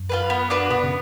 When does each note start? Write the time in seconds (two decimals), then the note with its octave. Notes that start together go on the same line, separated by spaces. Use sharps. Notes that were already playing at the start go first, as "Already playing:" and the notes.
Already playing: F#2
0.09 F4 G#4 B4
0.30 B3
0.50 D4 F#4 B4
0.70 B2 B3
0.84 C#3